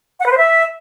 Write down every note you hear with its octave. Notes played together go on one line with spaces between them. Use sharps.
F#5
B4
C5
E5